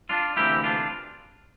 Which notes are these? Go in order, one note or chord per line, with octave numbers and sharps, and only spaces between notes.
D4 F4
D2 C3 E3 A#3 E4 G4
D4 F4